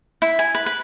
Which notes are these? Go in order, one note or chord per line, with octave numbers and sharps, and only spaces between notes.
E4
G#5
B4
B4